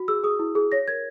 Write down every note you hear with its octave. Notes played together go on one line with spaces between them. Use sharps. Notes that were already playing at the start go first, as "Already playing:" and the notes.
Already playing: F#4
G#4 E6
G#4 D#6
E4
G#4
C#5 A#6
A#4 G#6